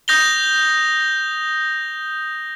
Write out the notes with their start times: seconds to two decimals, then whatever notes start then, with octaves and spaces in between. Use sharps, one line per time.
0.08 D#6 G6 A#6 F7 G7